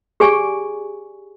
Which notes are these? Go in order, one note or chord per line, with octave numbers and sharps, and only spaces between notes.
G4 G#4 D5 G#5 C#6